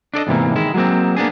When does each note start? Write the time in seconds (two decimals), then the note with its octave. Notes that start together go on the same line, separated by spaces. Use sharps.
0.14 D4 A4 D5 D#5
0.27 E2 G#2 C3 E3 A#3
0.56 D#3 G#3 E4
0.74 F#3 G#3 A#3 C4
1.17 A#3 B3 D4 G#4